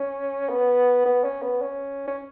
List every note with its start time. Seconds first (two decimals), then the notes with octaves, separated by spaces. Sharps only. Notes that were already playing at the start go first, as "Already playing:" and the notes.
Already playing: C#4
0.49 B3
1.06 B3
1.24 C#4
1.42 B3
1.62 C#4
2.07 C#4